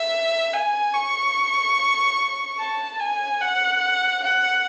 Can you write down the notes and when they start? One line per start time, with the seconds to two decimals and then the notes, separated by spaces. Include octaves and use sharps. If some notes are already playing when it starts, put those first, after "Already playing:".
Already playing: E5
0.53 G#5
0.94 C#6
2.59 A5
2.99 G#5
3.41 F#5
4.23 F#5